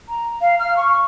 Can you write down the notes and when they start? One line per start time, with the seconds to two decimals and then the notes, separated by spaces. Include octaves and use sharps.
0.08 A#5
0.41 F5
0.59 F6
0.77 C#6